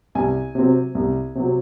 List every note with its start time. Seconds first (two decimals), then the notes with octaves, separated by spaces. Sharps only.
0.15 C2 G#5
0.55 C3 F#3 C4
0.95 C2
1.35 C3 F#3 C4